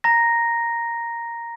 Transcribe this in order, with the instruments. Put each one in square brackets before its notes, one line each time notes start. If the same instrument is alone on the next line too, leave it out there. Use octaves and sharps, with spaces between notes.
[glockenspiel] A#5 A#6